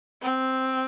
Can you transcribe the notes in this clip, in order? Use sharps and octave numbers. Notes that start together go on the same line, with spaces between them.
C4